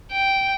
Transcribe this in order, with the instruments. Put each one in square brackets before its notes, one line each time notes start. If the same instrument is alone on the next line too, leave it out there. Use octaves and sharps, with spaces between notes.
[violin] G5